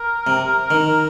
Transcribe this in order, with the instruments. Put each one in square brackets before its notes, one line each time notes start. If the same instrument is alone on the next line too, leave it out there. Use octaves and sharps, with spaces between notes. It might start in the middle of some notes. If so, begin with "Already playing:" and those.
Already playing: [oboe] A#4
[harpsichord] C3
D#3